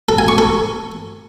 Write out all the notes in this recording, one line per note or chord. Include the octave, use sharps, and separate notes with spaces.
A4
G#5
C#6
A4